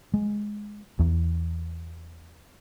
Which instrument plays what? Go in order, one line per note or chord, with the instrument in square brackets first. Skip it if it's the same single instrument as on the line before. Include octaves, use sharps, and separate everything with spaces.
[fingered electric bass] G#3
E2